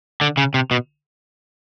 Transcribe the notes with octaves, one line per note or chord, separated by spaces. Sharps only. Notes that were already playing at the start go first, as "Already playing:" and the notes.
D3
C#3
C3
B2